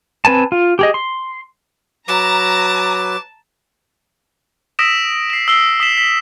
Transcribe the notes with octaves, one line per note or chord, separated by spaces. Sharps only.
C4 B4 G#5 A5
F4
G4 G#4 D#5
C6
F#3 B4 A5 A#5 D6
D#6 E6 A#6 B6 D7 E7
C7 E7
E6 B6 C7 G7
D#6 B6 E7
B6